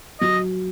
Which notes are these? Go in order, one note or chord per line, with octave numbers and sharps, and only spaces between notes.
F#3 D#5